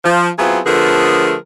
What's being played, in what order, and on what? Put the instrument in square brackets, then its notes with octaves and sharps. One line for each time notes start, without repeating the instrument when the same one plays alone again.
[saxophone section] F3
F#3 B3 C4 E4 F4 G#4
D3 F3 A3 B3 G#4 A#4